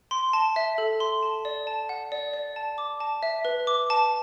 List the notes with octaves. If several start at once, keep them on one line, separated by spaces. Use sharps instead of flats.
C6
A5
E5
A4
C6
A5
D5
A5
F#5
D5
D5
A5
D6
A5
E5
B4
D6
A5